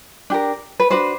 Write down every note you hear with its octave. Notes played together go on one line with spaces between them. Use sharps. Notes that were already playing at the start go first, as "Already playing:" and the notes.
D4 G4 A#4
B4
D4 F#4 B4 C5